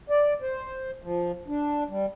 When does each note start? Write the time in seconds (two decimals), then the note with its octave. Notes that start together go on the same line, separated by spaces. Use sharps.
0.10 D5
0.42 C5
1.02 F3
1.48 D4
1.89 G3